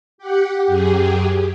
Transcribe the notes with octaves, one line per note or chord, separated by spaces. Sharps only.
G4 F#5
F#2 G4 G#4